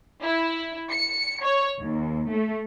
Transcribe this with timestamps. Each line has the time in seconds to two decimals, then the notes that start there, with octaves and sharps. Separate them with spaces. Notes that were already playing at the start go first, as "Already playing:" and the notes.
0.24 E4
0.92 C#7
1.43 C#5
1.79 D#2
2.29 A3